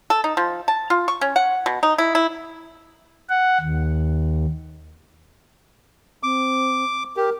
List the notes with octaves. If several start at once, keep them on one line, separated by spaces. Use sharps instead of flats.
A4
D#4
F3
A5
F4
C#6
C#4
F#5
B2
D#4
E4
E4
F#5
D#2
C4 D6
G4 A#4